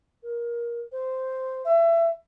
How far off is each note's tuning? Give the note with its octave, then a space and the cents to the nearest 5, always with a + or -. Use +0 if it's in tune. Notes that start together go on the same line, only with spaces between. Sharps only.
A#4 +20
C5 -5
E5 +25